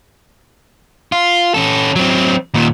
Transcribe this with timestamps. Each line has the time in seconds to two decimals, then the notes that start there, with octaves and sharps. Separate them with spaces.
1.12 F4
1.54 C#4 A4
1.96 F#3 C4
2.54 D#2 A#2